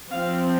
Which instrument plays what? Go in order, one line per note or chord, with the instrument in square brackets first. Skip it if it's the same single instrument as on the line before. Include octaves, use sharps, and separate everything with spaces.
[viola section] F3 C4 F5